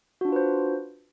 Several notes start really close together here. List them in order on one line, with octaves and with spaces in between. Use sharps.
F#4 D4 F4 B4 C5